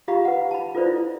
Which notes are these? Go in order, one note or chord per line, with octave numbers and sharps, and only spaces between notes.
F4 G4 F5 A#5 B5 C#6
B4 F#5
A5 B5
F4 A4 B4 C5 D5
E4